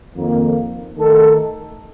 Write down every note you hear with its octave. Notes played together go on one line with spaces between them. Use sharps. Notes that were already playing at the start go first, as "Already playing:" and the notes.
F2 D#3 A#3
D#3 A3 D#4 A4